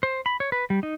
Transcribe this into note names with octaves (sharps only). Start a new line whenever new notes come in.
C5
B5
C#5
B4
G3
D#4